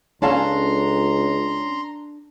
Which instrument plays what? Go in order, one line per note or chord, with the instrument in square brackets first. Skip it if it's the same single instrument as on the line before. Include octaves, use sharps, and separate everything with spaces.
[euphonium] C#2 [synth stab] C#4 [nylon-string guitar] D4 A4 F5 [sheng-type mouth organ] A#5 C6